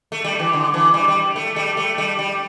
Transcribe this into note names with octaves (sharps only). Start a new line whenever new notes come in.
A3
G3
E3
D3
E3
G3
G3
A3
G3
A3
G3
G3